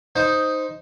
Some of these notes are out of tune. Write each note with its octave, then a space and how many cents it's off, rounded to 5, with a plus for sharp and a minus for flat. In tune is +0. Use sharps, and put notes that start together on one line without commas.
D#4 +0 C5 +0